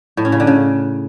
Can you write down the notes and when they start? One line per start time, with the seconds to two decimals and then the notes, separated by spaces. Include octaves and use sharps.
0.17 A2
0.25 C#4
0.32 C#3
0.40 D3
0.47 C#3